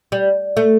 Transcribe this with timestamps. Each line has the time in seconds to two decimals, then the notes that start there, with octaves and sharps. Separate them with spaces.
0.12 G3
0.57 A3